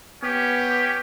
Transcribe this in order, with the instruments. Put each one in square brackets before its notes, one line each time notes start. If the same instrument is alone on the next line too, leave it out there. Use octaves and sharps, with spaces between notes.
[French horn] B3 [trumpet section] C#4 G4